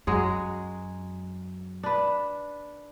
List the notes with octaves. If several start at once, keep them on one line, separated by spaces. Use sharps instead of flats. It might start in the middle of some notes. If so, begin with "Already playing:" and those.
F#2 F#3 G#3 G#4
D4 B4